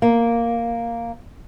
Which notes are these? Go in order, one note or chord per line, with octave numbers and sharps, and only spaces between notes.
A#3